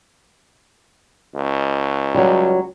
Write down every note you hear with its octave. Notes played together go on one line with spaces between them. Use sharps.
C#2
F#3 G3